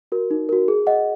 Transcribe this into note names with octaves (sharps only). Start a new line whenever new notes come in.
F#4 A#4
D#4
F#4 A#4
G#4
D#5 F#5